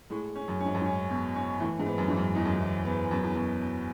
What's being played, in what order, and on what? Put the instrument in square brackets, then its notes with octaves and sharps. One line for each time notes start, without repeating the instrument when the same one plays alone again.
[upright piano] A2 [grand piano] G#3
[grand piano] C#4
[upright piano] F#2
[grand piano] C#4
[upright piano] G#2
F#2
[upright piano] G#2 [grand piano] C#4
[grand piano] B2
C#4
[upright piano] A2 [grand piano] E3
[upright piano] G#2
[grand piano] B3
[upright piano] F#2
[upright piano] G#2 [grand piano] E3
[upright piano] F#2
[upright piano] E2 [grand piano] D#4
[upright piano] F#2
E2
[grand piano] E3
B3
[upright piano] F#2 [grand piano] B2
[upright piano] E2
[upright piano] F#2 [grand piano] B2
[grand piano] B2